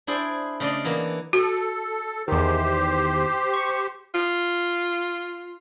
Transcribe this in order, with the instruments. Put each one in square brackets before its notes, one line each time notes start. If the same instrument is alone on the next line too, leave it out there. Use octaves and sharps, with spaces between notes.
[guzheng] D4 E4 G#4 C5 D5
C#3 A3 D4 D5 D#5
E3 A#3 B3
[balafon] F#4 [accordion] A4
[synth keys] E2 D#3 [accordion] G4 C5
[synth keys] C#6
[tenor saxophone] F4